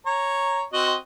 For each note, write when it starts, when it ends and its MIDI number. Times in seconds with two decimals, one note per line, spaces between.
0.06 0.62 73
0.06 0.62 82
0.73 0.95 60
0.73 0.95 66
0.73 0.95 75